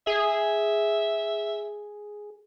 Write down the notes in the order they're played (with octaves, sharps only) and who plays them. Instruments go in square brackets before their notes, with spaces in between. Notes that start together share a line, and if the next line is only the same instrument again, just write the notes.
[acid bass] G#4 [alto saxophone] E5